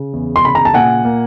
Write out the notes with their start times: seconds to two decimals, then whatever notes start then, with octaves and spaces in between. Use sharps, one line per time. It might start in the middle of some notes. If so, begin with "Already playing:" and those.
Already playing: C#3
0.13 E2
0.36 C6
0.44 C#3 B5
0.55 A#5
0.65 A5
0.74 A#2 F#5 G#5
1.05 A#3